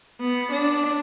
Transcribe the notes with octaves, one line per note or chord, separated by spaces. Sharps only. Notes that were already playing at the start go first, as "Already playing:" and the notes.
B3
D4